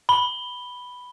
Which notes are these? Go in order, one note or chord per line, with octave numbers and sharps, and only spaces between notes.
B5 G7